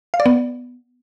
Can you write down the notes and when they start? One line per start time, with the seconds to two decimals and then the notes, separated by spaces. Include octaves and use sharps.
0.14 F5
0.20 D5
0.26 B3